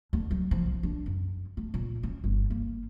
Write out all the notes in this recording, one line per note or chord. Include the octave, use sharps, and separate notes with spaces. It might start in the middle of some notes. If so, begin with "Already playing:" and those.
D2
F#3
F3
B1
D4
F#2
A3
A#2
C#4
G1
A#3